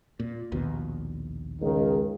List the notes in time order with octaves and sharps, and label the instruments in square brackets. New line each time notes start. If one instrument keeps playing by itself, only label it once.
[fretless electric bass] A#2
A#1 D#2 B2
[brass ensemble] C#2 D#3